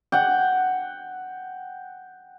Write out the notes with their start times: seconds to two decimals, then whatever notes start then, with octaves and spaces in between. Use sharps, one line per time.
0.12 F#5 G5